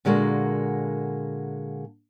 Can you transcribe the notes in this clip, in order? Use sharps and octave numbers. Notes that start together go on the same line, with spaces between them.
A#2 D3 G#3 A#3 F#4